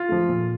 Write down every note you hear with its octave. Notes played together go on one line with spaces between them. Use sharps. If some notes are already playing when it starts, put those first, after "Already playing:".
Already playing: F4
F3 A3
A#2